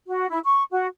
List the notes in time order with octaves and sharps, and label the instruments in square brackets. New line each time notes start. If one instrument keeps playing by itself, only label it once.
[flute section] F#4
E4
C#6
F#4